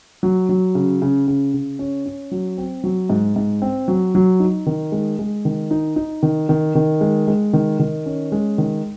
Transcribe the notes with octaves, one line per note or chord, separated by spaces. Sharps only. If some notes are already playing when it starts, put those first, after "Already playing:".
F#3
F#3
C#3
C#3
C#3
C#3
C#4
C#4
F#3
C4
F#3
G#2
G#2
C4
F#3
F#3
D#4
D#3
G#3
G#3
D#3
D#4
D#4
D#3
D#3
D#3
G#3
G#3
D#3
D#3
C#4
G#3
D#3